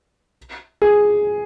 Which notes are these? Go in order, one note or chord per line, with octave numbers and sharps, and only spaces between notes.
G#4